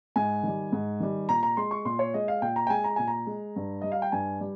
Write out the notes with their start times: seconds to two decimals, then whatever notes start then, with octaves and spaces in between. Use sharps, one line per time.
0.16 G#2 G#5
0.43 D#3 G3
0.72 G#2
1.00 D#3 G3
1.29 A#2 A#5
1.43 A#5
1.57 G#3 C6
1.71 C#6
1.85 A#2 C6
1.99 C#5
2.14 G#3 D#5
2.28 F5
2.42 A#2 G5
2.56 A#5
2.67 G5
2.70 G#3 G#5
2.84 A#5
2.96 A#2 G#5
3.08 A#5
3.27 G#3
3.56 G2
3.81 G3 D#5
3.92 F5
4.02 G5
4.12 G2 G#5
4.41 G3